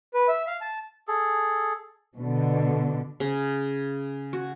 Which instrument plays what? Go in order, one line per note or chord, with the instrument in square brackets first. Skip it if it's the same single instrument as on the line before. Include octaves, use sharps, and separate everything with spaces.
[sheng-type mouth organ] B4
E5
F5
A5
[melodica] G#4 A4
[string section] B2 D3
[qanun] C#3
F#4